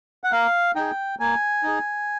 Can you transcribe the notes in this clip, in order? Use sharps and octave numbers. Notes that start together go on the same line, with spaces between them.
F#5
A#3 F5
D#4 G#4 G5
A#3 G#5
D#4 G#4